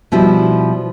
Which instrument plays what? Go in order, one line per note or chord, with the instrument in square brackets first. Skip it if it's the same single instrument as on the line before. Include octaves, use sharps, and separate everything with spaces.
[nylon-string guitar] B2 F3 G3 E4